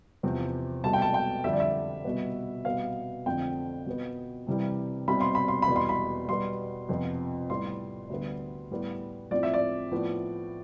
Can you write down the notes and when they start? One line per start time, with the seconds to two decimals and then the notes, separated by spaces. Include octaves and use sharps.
0.23 E2 C3 F3 C4
0.84 C2 B2 A3 A5
0.93 G5
1.02 A5
1.14 G5
1.44 F2 D3 G3 E5
1.53 D5
1.60 E5
2.05 C2 B2 B3
2.65 C2 B2 B3 F5
3.26 F2 D3 A3 C4 G5
3.87 B2 B3
4.47 C2 C3 E3 G3
5.07 C2 B2 G3 C4 B5
5.21 C6
5.35 B5
5.48 C6
5.62 B5
5.68 E2 B2 G3
5.76 C6
5.89 B5
6.29 B2 G3 B3 C6
6.89 F2 C3 F3 B3
7.50 A2 G3 B3 C6
8.10 D2 D3 G3 B3
8.71 A2 G3 B3
9.31 A2 F3 C4 D5
9.43 E5
9.54 D5
9.91 A2 F3 B3